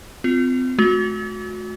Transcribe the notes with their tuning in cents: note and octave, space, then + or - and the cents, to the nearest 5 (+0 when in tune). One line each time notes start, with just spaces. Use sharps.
C4 -35 F4 +0
A3 -40 F#4 -25